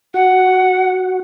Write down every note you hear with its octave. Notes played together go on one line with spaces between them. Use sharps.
F#4 F#5